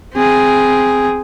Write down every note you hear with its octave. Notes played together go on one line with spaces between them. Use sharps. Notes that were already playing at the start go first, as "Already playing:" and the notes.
C4 G#4